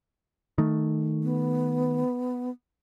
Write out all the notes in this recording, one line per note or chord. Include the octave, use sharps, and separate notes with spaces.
D#3 A3
B3